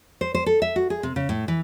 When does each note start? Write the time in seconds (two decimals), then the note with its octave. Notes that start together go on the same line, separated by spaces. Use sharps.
0.21 C5
0.34 C5
0.46 A4
0.62 E5
0.76 F#4
0.90 G#4
1.03 C3
1.16 C#3
1.29 A2
1.48 E3